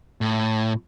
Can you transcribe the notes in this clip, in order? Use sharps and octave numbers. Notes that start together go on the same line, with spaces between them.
A2